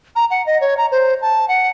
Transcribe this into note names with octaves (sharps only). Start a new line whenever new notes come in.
A#5
F#5
D#5
C#5
A#5
C5
A5
F#5